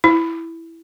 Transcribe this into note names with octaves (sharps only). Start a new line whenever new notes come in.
E4